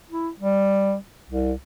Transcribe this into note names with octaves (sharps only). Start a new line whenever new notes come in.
E4
G3
C2